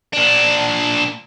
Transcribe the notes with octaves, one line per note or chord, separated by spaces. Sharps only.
A#2 D4